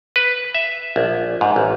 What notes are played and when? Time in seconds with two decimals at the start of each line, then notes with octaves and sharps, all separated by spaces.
0.16 B4
0.54 E5
0.96 A#1
1.41 G#2
1.56 A1